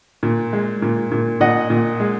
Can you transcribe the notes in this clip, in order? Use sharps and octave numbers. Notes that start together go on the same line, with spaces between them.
A#2
G#3
A#2
A#2
A#2 D#5 F#5
A#2
G#3